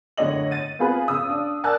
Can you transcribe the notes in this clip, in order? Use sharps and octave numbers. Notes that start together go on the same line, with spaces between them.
F#1 A2 D3 C#5 D#5 F#7
A6 D#7
B3 C4 F4 G#4 B4
C#3 D#6 E6
D4
A#4 D5 G#5 A5 E6 F#6